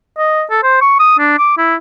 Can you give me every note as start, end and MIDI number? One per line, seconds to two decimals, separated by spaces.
0.18 0.43 75
0.50 0.63 69
0.63 0.77 72
0.81 0.97 85
1.00 1.18 87
1.19 1.38 62
1.38 1.55 86
1.58 1.75 64